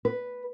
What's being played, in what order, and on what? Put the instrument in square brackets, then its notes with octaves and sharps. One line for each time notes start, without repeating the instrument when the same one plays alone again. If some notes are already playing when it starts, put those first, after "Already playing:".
[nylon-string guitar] B4